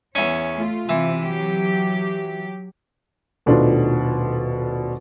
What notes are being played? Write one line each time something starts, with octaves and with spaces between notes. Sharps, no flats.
E2 C#4 C#5
A3 F4
C3 E3
F#3 G4
D#1 B2 A3 D4 D#4 F4